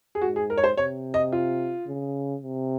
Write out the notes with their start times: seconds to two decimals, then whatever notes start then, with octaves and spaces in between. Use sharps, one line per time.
0.15 G#4
0.22 G#2 F#4
0.36 G#4
0.50 A#4
0.57 C#5
0.64 C5
0.77 C3 C#5
1.14 D#5
1.32 F4
1.87 C#3
2.42 C3